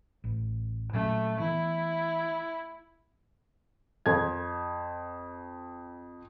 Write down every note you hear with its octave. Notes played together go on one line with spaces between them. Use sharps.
A1
A#2 F#3 A3 C#4
E3 B3 E4
F2 G#6